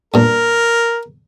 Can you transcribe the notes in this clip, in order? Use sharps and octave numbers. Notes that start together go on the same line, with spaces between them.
G2 A#2 A#4